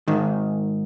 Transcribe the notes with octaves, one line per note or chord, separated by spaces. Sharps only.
G#2 D#3